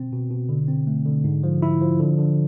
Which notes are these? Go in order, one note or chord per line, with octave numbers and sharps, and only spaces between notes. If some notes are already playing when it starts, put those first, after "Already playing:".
Already playing: B2 C4
B2
B2
D3
C4
A3
D3
G#2
F3
E4
F3
D3
D3